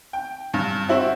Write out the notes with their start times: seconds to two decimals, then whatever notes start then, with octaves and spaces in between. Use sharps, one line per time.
0.13 G5
0.54 G2
0.89 C4 E4 F#4 C5